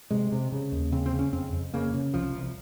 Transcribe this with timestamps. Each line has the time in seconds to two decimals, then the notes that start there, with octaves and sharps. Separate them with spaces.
0.11 C3 G#3
0.32 C3
0.52 C#3
0.72 D#2
0.92 C#3 C4
1.06 C4
1.13 C#3
1.19 C#4
1.33 F2 C4
1.53 F2
1.74 C#3 A#3
1.94 C#3
2.14 C2 F3
2.35 C2